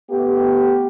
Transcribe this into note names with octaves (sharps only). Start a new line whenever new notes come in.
A3 B3 G4